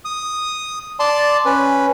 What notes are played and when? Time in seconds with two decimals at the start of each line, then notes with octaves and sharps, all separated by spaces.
0.05 D#6
0.99 D5 A5 C6
1.46 C#4 B4